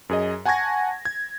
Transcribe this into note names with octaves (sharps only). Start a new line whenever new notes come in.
F#2 G#4 D#5
F#5 G#5 A5 C#6 G#6 A#6
G#6